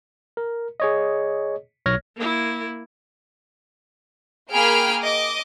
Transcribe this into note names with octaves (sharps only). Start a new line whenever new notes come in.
A#4
G#4 C#5 D#5
B1 C#5 F6 G#6 A#6
A#3 E4
A#3 G#4 G5 B5 F6 D7
D#5 D6